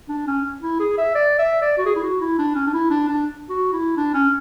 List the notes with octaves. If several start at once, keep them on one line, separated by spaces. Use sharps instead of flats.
D4
C#4
E4
G#4
E5
D5
E5
D5
F#4
G#4
E4
F#4
E4
D4
C#4
D4
E4
D4
D4
F#4
E4
D4
C#4